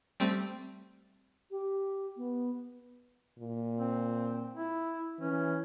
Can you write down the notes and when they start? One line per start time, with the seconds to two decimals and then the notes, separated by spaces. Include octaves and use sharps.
0.20 G3 A3 C4
1.51 G4
2.17 B3
3.39 A#2
3.78 C4
4.54 E4
5.19 E3 C#4